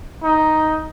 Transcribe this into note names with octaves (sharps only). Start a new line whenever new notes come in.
D#4